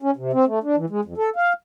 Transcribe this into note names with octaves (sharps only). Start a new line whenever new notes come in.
C#4
C3
C4
A3
D4
E3
G#3
F2
A4
F5